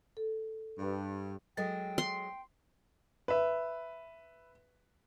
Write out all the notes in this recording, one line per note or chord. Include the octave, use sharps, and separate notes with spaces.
A4
G2
F#3 G#3 F#4 A4 D#5 G5 A6
C6
B4 E5